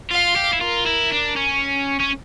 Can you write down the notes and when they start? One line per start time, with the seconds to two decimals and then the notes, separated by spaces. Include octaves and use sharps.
0.11 F4 F5
0.36 G4
0.53 E4
0.61 F4 A#4
0.86 E4
1.12 D4
1.36 C#4
2.00 C#4